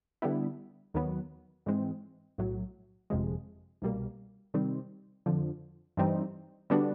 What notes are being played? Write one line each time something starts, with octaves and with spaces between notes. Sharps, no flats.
D3 G3 B3 E4
D#2 D#3 F#3 B3
G#2 E3 G#3 C4
B1 A2 F#3
G1 F2 C3 F3 G#3
C2 B2 G3 A#3
C3 D#3 G3 C4
F2 D3 F3
G2 E3 G3 C4 D#4
D3 G3 B3 D4 F#4